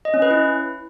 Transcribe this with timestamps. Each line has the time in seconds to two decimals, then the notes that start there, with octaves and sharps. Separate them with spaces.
0.05 D#5
0.14 C#4
0.22 B4
0.31 E4